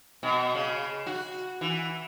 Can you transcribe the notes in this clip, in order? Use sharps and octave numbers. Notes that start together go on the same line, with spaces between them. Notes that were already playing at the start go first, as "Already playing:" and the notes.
B2
C#3
F#4
E3